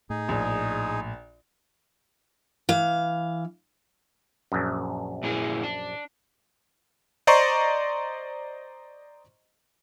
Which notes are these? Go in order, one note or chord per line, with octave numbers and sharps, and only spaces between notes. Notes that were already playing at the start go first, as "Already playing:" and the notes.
A2 D#4 G#4
A#1
E3 F5
A#1 F#2
A#2 E4 G#4
D4
C5 D5 D#5 A#5 C6 C#6